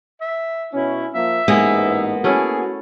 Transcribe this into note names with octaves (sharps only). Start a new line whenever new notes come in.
E5
B2 C#4 E4
F3 A#3 E5
A1 G#2 G#3 A#3 B3 G#4
A3 C#4 E4 F#4 G#4